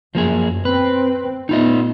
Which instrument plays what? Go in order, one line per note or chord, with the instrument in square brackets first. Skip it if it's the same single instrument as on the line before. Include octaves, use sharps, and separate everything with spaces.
[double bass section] F#2 [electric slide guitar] F3 A#3 G#4
[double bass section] C4 [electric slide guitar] B4
[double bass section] A#2 A3 B3 [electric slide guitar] D#4 F4 D#5